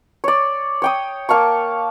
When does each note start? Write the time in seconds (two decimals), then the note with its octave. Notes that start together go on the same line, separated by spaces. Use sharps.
0.24 C#5 D5
0.82 C#5 G5 D#6
1.29 A#3 F5 A5 C#6